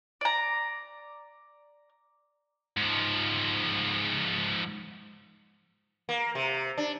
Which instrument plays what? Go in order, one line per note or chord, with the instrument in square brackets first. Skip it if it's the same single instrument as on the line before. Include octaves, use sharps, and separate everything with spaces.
[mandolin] D5 A#5
[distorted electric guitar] G#2 F3
[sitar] A#3
C3
D4